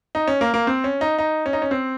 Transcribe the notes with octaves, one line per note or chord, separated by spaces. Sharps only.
D#4
C#4
A#3
A#3
C4
C#4
D#4
D#4
C#4
D#4
C#4
C4